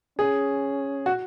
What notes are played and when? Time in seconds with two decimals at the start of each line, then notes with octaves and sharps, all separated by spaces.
0.19 C#4 G#4
1.06 F#4